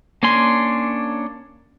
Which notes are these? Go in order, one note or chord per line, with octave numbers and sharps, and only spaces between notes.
A#3 C#4 D4 G#5 C6